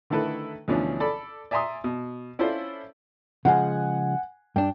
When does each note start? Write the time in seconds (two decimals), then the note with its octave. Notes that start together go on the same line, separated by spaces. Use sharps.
0.10 D3 D#3 A3 E4 A4 B4
0.68 D2 B2 E3 F3 C#4 D4
1.00 A4 D5 B5
1.51 D5 E5 G#5 A#5 C6 D#6
1.84 B2
2.39 C#4 E4 F4 A4 C5 D5
3.45 C#3 F3 G#3 F#5 G#5
4.56 G2 D4 G5